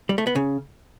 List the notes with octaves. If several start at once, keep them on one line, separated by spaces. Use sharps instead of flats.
G3
A3
B3
C#3